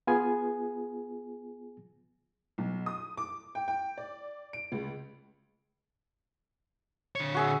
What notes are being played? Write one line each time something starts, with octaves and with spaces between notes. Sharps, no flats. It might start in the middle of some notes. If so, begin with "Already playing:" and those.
B3 F4 G#4 G#5
B1
D#6
D6
G5
G5
D5
D7
C#2
D3 C#5
F#4 G#4 E5